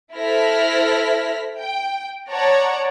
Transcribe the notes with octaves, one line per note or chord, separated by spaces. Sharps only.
E4 A4 C5 F6 A#6 B6
G5
C#5 D5 F#5 A5 A#5